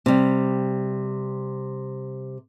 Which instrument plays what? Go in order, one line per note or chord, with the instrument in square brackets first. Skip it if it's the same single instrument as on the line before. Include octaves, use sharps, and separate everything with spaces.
[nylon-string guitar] C3 G3